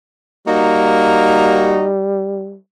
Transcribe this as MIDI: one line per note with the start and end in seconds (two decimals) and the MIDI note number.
0.47 2.57 55
0.47 1.81 58
0.47 1.86 63
0.47 1.86 66